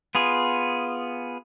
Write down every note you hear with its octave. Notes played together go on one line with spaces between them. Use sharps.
B3 F4 G#4